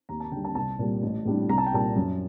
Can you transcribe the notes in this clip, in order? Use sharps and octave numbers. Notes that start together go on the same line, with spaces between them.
D#2 A#5
A5
D3 G3 G5
A5
C2 A5
A#2 G3
A1
A2 G3 D4
C2 A#5
A5
G5
A#2 G3 A5
F#2